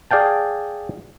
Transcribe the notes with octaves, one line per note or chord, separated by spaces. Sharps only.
G#4 D5 F5 G5 A5